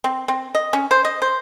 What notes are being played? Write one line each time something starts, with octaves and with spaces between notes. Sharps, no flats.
C4
C4
D#5
C#4
C5
D#5
C5